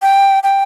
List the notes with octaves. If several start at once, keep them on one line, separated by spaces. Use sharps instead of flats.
G5
G5